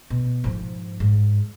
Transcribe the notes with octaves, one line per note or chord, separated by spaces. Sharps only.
B2
G#2 F3
G#2